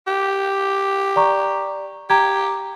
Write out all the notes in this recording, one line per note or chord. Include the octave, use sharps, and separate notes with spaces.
G4
D5 A#5 C#6
G4 A#5 G#6